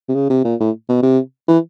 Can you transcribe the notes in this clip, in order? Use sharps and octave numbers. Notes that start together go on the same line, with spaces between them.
C3
C#3
C3
A#2
A2
B2
C3
E3